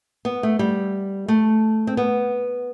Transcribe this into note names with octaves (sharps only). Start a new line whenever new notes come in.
B3
A3
G3
A3
C4
B3